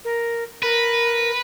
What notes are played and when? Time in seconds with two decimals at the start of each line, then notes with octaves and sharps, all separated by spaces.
0.05 A#4
0.63 A#4 B4